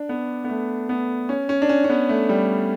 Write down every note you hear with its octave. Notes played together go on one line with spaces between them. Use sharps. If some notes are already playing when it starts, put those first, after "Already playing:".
Already playing: D4
B3
B3
A3
B3
C#4
C#4
D4
C#4
C#4
B3
A3
G3